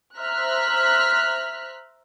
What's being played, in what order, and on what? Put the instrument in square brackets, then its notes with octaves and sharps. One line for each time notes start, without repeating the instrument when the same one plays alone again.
[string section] C5 E5 A#5 F6 F#6 B6